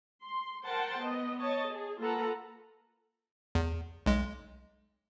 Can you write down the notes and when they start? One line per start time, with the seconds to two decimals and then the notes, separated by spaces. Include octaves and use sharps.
0.23 C6
0.65 A#4 C5 F#5 G5 A5 C6
1.00 B3 D#5
1.40 C#5 D#5 A5
1.69 G#4
1.99 A#3 F4 A4 B4 F#5 A#5
3.55 E2
4.06 B1 G#3